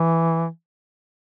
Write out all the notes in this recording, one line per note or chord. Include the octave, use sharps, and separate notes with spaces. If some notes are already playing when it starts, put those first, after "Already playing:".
Already playing: E3